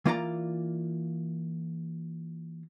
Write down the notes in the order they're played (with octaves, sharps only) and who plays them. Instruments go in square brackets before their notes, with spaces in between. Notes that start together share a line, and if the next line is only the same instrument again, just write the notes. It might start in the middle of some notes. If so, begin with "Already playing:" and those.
[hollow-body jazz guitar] E3 A#3 F4 D5 G5 A#5